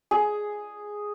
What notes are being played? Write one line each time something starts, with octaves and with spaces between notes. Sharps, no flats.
G#4